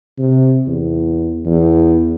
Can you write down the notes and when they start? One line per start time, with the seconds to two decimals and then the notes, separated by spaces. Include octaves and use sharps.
0.19 C3
0.67 E2
1.46 E2